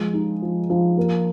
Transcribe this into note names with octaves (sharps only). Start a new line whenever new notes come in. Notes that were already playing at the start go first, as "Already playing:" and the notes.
Already playing: F3 G#3
D#4
F3
F3
A#3